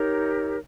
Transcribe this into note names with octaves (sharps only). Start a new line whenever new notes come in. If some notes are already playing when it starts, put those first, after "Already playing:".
Already playing: D#4 G4 A#4 C#5